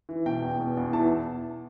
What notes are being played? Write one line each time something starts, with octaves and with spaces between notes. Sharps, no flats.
E3
B2 G5
E2
B2
E2
E3 A5